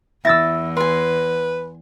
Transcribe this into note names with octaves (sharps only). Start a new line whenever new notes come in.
E2 E4 E6 A6 A#6
B4 G#5 C6